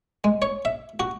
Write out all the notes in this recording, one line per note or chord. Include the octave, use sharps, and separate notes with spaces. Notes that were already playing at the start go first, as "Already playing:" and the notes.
G#3
C#5
E5
F#4